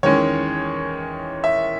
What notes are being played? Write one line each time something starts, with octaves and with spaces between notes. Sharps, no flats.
E2 D#3 G#3 C#4 C#5
E5